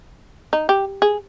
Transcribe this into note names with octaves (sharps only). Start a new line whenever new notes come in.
D#4
G4
G#4